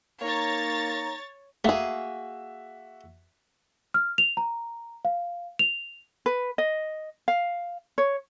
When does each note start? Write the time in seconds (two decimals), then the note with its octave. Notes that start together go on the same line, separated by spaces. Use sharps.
0.22 A#3 D#4 C#5 A#5 A6
1.65 A3 A#3 F#4 G#4 E5
3.94 F6
4.18 F7
4.37 A#5
5.05 F5
5.59 F7
6.26 B4
6.58 D#5
7.28 F5
7.98 C#5